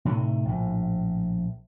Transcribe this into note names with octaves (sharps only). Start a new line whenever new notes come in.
A2 C3 D#3
A#1 A2